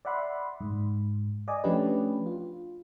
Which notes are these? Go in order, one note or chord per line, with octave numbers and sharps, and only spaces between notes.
D5 E5 F#5 B5 C6
G#2
D5 D#5 G#5
F3 A3 C#4 D4 G4 B4
F4